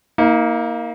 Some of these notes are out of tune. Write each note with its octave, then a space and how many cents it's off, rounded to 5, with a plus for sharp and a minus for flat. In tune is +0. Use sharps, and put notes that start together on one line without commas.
A#3 +0 D#4 +45